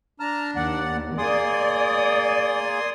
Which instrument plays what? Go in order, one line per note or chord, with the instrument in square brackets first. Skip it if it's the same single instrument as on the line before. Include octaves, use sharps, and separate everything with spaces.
[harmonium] D4 [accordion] A5 A#5 F6
[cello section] D#2 [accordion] D5 F#5
[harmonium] A#3 G#4 [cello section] D5 [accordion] G#5 C6 D#6